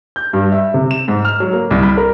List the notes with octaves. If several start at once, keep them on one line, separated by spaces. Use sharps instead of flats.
G6
G2
E5
C3
E7
G#2
F6
F#3
A#3
C2
B5
A#4